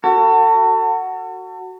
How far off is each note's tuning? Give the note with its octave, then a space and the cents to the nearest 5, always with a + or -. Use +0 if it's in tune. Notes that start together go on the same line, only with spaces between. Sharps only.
F#4 +10 A4 +35